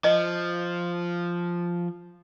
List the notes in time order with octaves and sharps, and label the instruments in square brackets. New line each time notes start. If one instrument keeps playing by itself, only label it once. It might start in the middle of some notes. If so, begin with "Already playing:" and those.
[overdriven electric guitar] F3 [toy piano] D#5